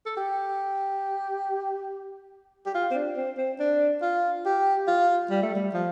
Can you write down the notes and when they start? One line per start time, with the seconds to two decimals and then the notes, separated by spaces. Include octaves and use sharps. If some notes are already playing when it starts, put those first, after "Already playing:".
0.06 A4
0.17 G4
2.66 G4
2.74 F4
2.91 C4
2.95 D4
3.17 C4
3.38 C4
3.60 D4
4.02 F4
4.46 G4
4.88 F4
5.31 G3
5.43 A3
5.55 G3
5.74 F3